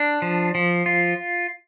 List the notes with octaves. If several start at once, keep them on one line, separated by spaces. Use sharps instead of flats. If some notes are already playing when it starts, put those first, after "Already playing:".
Already playing: D4
F3
F3
F4